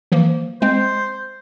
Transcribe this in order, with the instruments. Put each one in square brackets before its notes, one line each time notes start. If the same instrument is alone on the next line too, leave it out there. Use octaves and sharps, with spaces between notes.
[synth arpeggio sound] E3 F3 A#3
[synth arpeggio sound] G#3 C4 [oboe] C5